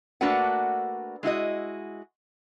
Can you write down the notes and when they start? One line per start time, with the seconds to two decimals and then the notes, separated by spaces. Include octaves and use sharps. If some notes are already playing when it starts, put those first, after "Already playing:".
0.21 A3 A#3 D4 F#4 B4 F#5
1.23 G#3 E4 F#4 D#5